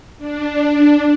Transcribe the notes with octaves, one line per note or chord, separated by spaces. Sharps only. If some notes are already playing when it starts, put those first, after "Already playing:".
D4